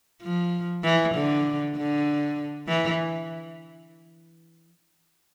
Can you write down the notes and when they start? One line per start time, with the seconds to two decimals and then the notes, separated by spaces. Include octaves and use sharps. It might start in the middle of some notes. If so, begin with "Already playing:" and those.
0.22 F3
0.84 E3
1.15 D3
1.76 D3
2.68 E3